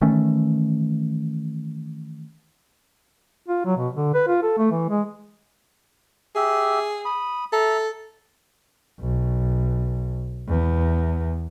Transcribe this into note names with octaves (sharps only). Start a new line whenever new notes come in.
D#3 E3 A3 C#4
F4
F#3
B2
D3
B4
F4
A4
A3
E3
G#3
G4 G#4 E5
B5 D#6
A4 E5 A#5
B1
E2